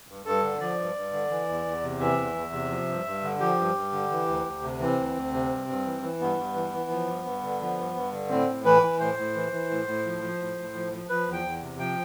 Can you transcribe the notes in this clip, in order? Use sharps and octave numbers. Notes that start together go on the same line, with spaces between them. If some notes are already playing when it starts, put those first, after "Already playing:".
G2
G2 A4
D3
F3 D5
G2
G2
D3
E3
E2
E2
C3
E3 E5
E2
E2
C3
F3
G2
G2
D3
F3 G4
G2
G2
D3
E3
D2
D2
C3
E3 C4
D2
D2
C3
G2
G2
E3
E3
G2 B3
G2
E3
E3
F3
G2
G2
D3
F3
G2
G2
D3
A2 C4
A2
E3 B4
E3
A2 C5
A2
E3
E3
A2
A2
F3
F3
A2
A2
F3
F3
F3 B4
E2
G5
E2
C3
F3 G5